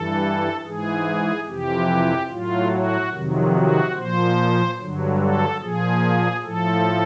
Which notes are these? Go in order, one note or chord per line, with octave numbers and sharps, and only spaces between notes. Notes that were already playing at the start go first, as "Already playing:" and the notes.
Already playing: G2 E3 A4
G#2 E3 G#4
F2 C3 E3 G4
A2 F#3 F4
F#4
F2 C3 D#3 F#3
F#4
A#2 F3 C5
G2 D3 F#3
A4
A#2 F3 G#4
A2 F3 A4